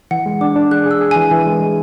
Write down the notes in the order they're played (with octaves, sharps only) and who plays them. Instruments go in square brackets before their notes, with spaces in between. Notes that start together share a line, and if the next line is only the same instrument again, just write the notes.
[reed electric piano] E3 [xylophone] F#5
[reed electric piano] G#3
[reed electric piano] D4 [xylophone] D6
[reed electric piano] D4
[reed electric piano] G#4 [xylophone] F#6
[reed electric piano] G#4 [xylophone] E6
[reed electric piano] G#4
[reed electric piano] E3 [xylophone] G#5
[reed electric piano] E3
G#3
G#3